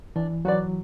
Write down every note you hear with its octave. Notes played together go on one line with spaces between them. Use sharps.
E3 D4
F#3 F#4 B4 D5